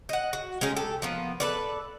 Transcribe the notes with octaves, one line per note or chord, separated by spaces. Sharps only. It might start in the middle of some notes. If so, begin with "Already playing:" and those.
D#5 F#5
F#4
G#3 C#4 D#4 G#4
G4 A4
F3 A#3 B3
A4 B4 D5